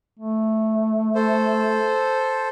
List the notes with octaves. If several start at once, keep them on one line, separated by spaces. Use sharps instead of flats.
A3
A4 C5